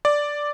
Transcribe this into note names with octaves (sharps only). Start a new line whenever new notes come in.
D5